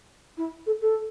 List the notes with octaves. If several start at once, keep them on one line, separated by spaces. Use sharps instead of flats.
E4
A4
A4